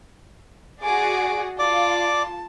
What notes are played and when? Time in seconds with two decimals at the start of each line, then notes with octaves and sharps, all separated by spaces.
0.82 F#4 G#4 D5 G#5 D6
1.59 F4 D5 A5 D6